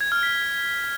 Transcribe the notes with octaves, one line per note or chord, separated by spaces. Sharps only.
G#6
F6
B6